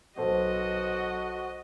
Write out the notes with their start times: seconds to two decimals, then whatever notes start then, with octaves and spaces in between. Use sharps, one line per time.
0.17 B1 B2 F#4 A4 C5 D#5